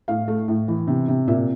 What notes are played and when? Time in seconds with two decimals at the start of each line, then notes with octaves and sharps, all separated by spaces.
0.08 A2 F5
0.28 A3
0.48 A2
0.68 E3
0.88 C3
1.08 C3
1.27 A#2 E5